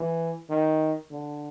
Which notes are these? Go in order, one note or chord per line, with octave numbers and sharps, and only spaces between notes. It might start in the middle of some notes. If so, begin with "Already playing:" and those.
Already playing: E3
D#3
D3